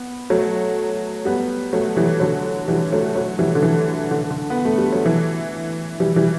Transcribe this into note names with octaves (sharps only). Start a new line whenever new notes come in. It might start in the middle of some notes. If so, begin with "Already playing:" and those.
Already playing: B3
F#3 A3
G3 B3
F#3 A3
E3 G3
D3 F#3
E3 G3
F#3 A3
F#3 A3
E3 G3
D3
E3
D3
D3
B3
A3
G3
F#3
E3
E3 G3
E3 G3